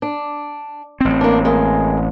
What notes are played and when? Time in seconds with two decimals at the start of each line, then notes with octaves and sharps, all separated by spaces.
0.02 D4
1.01 A1 C4
1.21 A#3 D4
1.45 G#3 A#3